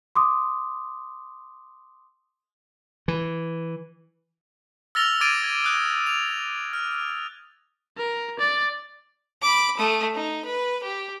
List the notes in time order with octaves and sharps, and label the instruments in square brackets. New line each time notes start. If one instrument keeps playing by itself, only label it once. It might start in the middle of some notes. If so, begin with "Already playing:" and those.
[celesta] C6 D6 D#6
[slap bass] E3
[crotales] E6 F6 A6 A#6 F7 G7
D6 G#6 A6 D7 D#7
G#6
D#6 F#6
F7
F6
[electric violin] A#4
D5
[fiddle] B5 D6
A3 D#6
D#4
B4
G4